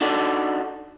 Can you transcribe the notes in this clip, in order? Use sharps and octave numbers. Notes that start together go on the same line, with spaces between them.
D4 D#4 F#4 A4 D5